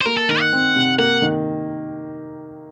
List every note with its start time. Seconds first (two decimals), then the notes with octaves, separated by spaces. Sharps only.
0.01 C5
0.05 A#3 A#4
0.17 A4
0.29 D#3 A#4
0.40 F#5
0.53 C4
0.76 C3
0.98 A#3 F#5
1.22 D#3